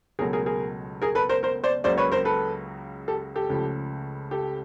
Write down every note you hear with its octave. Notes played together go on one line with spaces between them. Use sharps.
C#2 B2 F#3 A3 G#4 A#4
G#4 A#4
G#4 A#4
G#4 A#4
A4 B4
A#4 C5
A#4 C5
C5 D5
C#2 C#3 F#3 A#3 C5 D5
B4 C#5
A#4 C5
A4 B4
G4 A4
G4 A4
C#2 C#3 F3 A3
G4 A4